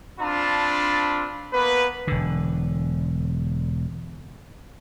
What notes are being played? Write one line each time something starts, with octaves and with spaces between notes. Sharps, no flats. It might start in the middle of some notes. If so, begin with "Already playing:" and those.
C4 D4 F4 A5 B5
A#3 B3 B4
E1 D3